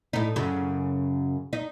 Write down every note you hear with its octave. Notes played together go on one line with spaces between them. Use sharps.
A2 D#4
F#2 C#3
D#4